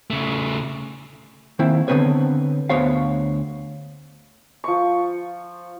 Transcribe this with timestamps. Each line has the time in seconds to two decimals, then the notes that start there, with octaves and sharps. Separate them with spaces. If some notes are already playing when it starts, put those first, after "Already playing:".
0.10 C#3 A3
1.59 D#3 A#3 C4 E4
1.88 D3 D#3 B3 C4 B4 C#5
2.69 D2 B3 C5 C#5 F5
4.64 F3 C#6